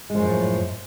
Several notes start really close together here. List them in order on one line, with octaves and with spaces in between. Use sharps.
G#3 F3 F#2 A2